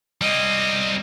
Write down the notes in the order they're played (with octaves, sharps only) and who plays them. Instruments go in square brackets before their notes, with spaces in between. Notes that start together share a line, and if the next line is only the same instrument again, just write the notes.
[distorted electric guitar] G3 C4 [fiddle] D#5